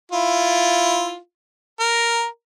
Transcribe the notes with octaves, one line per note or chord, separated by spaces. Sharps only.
E4 F4
A#4